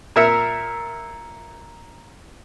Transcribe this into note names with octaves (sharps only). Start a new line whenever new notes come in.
A#2 A#4 E5 A#5 C#7